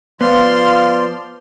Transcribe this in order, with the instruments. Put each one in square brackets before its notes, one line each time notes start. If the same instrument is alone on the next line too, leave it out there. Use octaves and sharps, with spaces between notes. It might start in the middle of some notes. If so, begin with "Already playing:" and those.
[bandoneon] F3 C5 D5 [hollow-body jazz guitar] B3 [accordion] F4 [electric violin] C6 F6